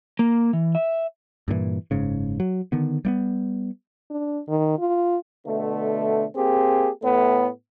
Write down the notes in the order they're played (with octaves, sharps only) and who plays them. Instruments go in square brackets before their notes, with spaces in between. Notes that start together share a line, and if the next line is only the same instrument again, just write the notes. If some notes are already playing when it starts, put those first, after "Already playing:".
[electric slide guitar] A#3
E3
E5
[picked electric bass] G2 A#2 D3 E3
F#1 G#2 C#3
F#3
D3 D#3 B3
G3 A#3 B3
[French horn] D4
D#3
F4
[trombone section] B2 D3 A3
A#3 C4 G4 G#4
A2 A3 B3